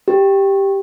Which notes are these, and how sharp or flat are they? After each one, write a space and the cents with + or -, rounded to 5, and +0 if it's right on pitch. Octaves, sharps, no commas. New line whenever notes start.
G4 +0